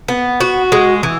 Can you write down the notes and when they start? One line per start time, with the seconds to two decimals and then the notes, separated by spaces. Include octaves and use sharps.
0.08 B3
0.40 F#4
0.72 G#3
1.03 E3